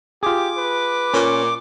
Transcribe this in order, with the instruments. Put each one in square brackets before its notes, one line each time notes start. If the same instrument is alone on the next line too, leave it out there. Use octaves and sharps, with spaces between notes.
[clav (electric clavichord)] F4 G#4 [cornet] G4 [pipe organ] D6
[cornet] B4
[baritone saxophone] A#2 [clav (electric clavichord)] C#4